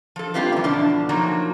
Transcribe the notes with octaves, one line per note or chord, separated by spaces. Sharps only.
F3 A4
G3 A3 C4 F4 G4 B4
F#2 E3
E2 B2 D3 F3 D4 A4
F3 F#3 A#3 D#4 F#4